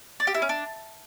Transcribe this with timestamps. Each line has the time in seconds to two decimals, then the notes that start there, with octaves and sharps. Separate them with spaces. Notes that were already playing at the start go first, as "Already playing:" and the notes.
0.20 D5
0.27 G4
0.34 E4
0.42 C#4
0.49 D4